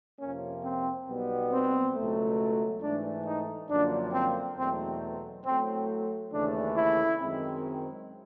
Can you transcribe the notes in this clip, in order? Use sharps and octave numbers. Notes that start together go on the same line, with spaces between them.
F2 C3 F3 A#3 C#4
C4
B1 B2 G3 B3
C4
C#2 B2 F#3 A3
G#2 E3 A3 D4
D#4
F#2 D3 F3 A#3 D4
C4
E2 B2 F#3 A3 C4
A2 F#3 A3 C4
D#2 C#3 E3 A3 D4
E4
F#2 D#3 G#3 C4